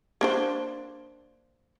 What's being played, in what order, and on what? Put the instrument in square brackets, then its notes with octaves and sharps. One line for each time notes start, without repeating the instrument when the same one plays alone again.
[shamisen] A#3 D4 C5